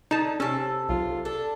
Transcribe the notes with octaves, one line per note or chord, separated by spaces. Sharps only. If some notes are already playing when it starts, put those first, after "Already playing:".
D3 D#4 A5
C3 C#4 A4
B1 F4
D4 A4